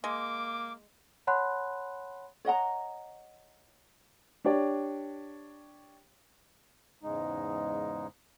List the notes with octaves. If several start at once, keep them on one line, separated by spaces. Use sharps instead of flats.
G#3 A#3 D6
C#5 F#5 A5 B5 C6 F#6
C#5 D#5 F#5 A#5
D4 G4 C#5 D5
E2 G#2 C#3 G#3 D#4